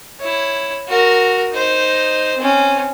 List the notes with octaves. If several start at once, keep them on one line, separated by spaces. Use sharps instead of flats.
E4 C#5
F#4 A#4
D#4 C5
C4 C#4